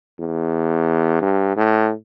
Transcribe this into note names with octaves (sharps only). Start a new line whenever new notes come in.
E2
G2
A2